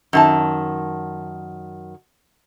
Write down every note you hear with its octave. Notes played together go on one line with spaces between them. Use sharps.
F#2 D#3 A5